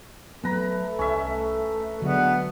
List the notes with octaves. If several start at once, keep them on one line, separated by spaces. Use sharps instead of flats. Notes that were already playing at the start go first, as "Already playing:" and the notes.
F#3 A3 B3 B4 A#5 B5
C2 C#4 E5
D3 F#3 G#3 A3 B3 D4 F#4